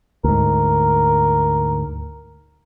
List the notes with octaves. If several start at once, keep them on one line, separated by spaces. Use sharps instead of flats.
D2 G#2 A#4